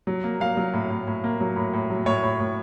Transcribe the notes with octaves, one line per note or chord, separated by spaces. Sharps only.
F#3
A#3
F#3 F5
F#3
A2
A2
A2
A#3
F#3
A2
A2
F#3
A2 C#5
A2
A2